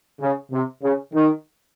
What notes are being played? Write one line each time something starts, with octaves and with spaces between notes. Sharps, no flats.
C#3
C3
C#3
D#3